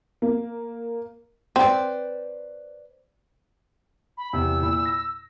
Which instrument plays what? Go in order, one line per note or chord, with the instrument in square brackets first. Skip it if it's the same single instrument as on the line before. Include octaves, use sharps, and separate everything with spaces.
[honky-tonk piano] A#3
[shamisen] C4 [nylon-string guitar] B4 C5 D5
[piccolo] B5
[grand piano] E2 C3 [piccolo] E6
[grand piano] A#2 E4 B5
A#6